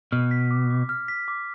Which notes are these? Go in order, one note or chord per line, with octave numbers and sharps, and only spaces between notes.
B2 F6
B6
D6
D6
F6
B6
D6